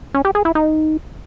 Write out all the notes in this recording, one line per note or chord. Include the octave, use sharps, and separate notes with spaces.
C#4
G4
G#4
E4
D#4